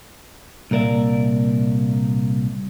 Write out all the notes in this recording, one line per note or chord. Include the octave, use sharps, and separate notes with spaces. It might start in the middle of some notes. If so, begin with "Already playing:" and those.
C2 A#2 A#4 D5 E5